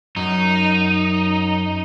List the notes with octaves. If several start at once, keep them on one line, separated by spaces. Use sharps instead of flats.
F#2 D#4